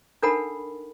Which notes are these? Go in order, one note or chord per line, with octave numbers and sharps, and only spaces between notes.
D4 D#4 A4 A#4 F#5 B5